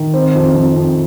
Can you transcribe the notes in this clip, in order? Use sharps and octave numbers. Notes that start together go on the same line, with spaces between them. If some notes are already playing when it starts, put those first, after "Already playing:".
Already playing: D#3
C4
F2
F2
F2